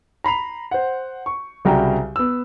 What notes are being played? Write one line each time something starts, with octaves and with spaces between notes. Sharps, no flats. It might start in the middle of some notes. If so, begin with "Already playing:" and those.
A#5 B5 C7 F7
C5 F#5
C#6
C2 C#3 G3 F#4 G5 A#5
B3 E6